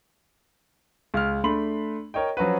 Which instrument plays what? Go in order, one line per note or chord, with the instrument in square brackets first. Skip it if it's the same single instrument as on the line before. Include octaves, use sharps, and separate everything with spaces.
[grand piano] C#2 F6
A3 D4 B5 C6 F#7
A#4 C#5 D#5 G5
F3 F#3 C#4 F#4 B4